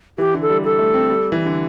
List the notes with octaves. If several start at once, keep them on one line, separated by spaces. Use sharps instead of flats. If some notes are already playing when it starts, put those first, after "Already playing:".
E3 G4
D3
A4
G3
G3 A4
A3
C4
G3
E3
D3